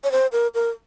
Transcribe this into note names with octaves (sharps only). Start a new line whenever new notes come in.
C#5
C5
A#4
A#4